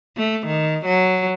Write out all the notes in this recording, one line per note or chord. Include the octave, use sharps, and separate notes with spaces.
A3
D#3
F#3